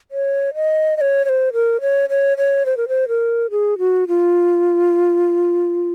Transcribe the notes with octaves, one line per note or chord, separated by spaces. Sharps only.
C#5
D#5
D#5
C#5
C#5
C5
A#4
C#5
C#5
C#5
C5
A#4
C5
A#4
G#4
F#4
F4